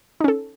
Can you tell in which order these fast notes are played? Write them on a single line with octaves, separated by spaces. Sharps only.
D#4 C#4 A4